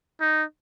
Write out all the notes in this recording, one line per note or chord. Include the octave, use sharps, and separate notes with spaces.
D#4